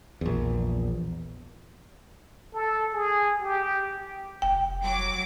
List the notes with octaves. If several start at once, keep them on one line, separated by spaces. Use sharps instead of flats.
A#1 E2
A4
G#4
G4
F1 G5
F#3 D6